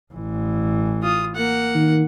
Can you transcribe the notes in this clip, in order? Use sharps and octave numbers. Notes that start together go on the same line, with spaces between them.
A1 E3
F4 D#6
A#3 F#5
D#3